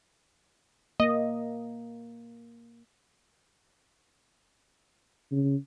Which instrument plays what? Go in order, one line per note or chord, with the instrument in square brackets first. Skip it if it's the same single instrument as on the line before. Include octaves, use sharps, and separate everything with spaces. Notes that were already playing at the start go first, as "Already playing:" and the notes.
[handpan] A#3 [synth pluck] D#5
[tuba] C#3